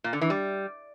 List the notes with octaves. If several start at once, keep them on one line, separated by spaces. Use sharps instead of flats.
A#2
D3
E3
G3